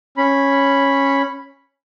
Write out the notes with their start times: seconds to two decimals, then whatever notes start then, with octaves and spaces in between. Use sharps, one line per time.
0.17 C#4 B5